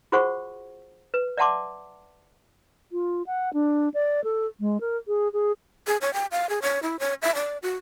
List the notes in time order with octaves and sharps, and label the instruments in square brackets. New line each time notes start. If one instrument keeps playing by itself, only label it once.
[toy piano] F4 F#4 G#4 C5 F#5 C#6
B4
D5 E5 F#5 A5 C6 D6
[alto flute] F4
F#5
D4
D5
A4
G#3
A#4
G#4
G#4
[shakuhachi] G#4
C#5
G5
F5
G#4
C#5
E4
C#5
E5
D5
F#4